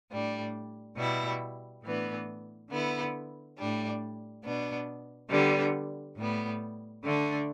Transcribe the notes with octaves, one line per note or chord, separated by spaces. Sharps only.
A2 G3 D4
B2 G3 E4
A2 E3 B3 D4
D3 B3 E4
A2 G3 D4
B2 B3 D4
D3 G3 B3 D4
A2 G3 B3
D3 A3 D4